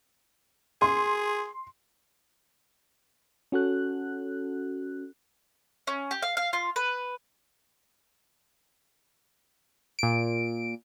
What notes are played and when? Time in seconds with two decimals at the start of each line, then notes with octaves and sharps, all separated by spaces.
0.82 G#4 C6
3.52 C#4 F#4 A4 F#6
5.87 C#4
6.11 G4
6.22 F5
6.37 F5
6.53 F4
6.76 B4
9.99 A#2 D7